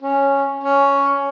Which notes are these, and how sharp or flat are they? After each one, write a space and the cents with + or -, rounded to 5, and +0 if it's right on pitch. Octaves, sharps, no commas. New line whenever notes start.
C#4 -5
C#4 +5